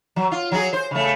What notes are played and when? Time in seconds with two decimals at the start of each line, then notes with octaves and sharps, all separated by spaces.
0.16 F#3
0.31 F4
0.52 F#3 G#4
0.73 C5
0.91 C#3 A3